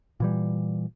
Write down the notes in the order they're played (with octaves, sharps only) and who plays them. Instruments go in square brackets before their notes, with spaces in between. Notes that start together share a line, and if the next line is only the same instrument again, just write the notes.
[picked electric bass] A#2 E3 G3